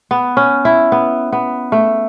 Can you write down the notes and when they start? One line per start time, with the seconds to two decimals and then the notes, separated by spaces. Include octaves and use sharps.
0.11 B3
0.37 C#4
0.65 E4
0.92 B3
1.32 B3
1.72 A3